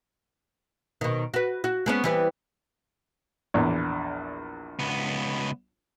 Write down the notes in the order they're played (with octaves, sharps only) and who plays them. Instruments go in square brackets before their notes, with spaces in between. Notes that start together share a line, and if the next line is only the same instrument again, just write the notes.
[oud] B2 D#3
F#4 B4
F#4
G#3 B3 C#4
E3 G3 B3
[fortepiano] A#1 E2
[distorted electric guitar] C#2 B3